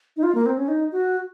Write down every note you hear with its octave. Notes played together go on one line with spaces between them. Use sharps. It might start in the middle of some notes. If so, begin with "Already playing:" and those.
D#4
F4
A#3
C4
C#4
D#4
F#4